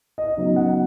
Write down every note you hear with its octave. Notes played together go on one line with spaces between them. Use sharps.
D#5
C#3 F#3 B3 D#4
F#5